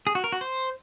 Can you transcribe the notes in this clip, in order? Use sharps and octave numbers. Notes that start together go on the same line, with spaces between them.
G#4
F#4
A#4
F#4
C5